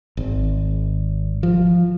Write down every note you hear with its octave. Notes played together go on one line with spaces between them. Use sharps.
G#1
F3